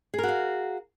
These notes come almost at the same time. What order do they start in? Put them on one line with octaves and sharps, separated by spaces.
G#4 A#4 F#4 F5